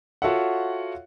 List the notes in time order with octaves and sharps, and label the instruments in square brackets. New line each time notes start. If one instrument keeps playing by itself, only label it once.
[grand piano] F4 F#4 A4 C#5 E5 F#5